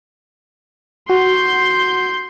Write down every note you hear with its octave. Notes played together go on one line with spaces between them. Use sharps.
F#4 C6 G6